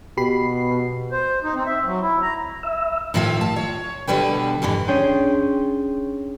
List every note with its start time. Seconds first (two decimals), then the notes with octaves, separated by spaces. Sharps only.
0.17 B2 G4 B5 C7
1.11 C5
1.43 D#4
1.55 C4
1.66 E5
1.85 F#3
2.01 E4
2.22 A#5
2.63 E5
3.14 A2 D#3 F3 E5 F5
3.41 A5
3.56 C#5
4.07 B2 D3 G3 B4 G5
4.62 F2 G#2 D3 E3
4.88 C#4 D4 G#4 C#5 G5 C6